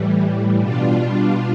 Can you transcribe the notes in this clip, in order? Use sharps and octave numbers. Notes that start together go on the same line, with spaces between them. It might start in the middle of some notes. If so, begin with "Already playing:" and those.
Already playing: A2 E3 G3
B2 G3 D4 F4